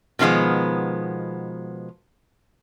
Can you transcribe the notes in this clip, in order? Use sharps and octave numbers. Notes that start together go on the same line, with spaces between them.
B2 D#3 F3 G#3 B3